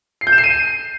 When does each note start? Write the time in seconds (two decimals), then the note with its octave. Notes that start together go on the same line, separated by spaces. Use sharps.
0.21 C7
0.27 G6
0.32 E7
0.38 C7
0.44 D#7